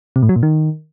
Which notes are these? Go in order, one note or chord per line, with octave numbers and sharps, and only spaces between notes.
C3
A2
F#3
A#2
D#3